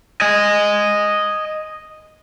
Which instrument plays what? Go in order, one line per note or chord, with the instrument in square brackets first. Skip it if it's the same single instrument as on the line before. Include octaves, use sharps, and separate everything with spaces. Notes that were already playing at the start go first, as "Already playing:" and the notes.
[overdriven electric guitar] D#5 G#5